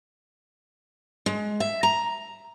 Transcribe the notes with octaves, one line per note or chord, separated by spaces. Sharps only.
G#3
E5
A#5